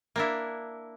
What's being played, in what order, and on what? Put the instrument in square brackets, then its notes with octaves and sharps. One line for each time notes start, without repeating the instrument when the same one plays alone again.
[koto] A#3 D4 E4